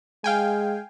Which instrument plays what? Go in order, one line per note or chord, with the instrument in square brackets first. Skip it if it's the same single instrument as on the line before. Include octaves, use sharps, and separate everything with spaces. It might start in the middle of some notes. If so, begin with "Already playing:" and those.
[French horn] G#3 [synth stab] F5 G5 G#5